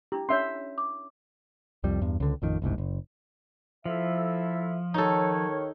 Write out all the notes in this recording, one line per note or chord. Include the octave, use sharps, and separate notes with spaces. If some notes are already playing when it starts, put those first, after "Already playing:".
D4 E4 G4
C#4 D4 C#5 E5 C6
D6
C2 F2 G3
E2 G2
C#2 D3
A1 F2 D#3
F#1 C2 G#2
F#1
F3 E4 A4 E5
D#2 D#3 D#4 A4 C#5